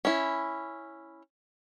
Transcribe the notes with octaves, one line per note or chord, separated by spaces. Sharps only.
C#4 E4